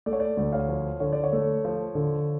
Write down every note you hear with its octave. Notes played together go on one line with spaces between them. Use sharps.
A3 D5
C#5
D5
D2
C#5 F5
F3
D3 C#5
D5
C#5
A3
F3
D3